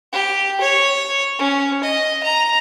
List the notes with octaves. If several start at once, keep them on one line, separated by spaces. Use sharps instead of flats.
G4
C#5
C#4
D#5
A#5